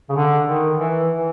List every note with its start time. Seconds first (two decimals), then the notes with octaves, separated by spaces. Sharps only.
0.09 C#3
0.16 D3
0.47 D#3
0.79 E3
1.10 E3